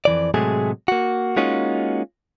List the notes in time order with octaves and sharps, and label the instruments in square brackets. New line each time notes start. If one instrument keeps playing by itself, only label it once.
[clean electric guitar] F2 E3 D5
A2 C3 F#3 G#3 A3 G#4
A#3 F#4
G#3 A#3 C#4 D#4 F4 F#4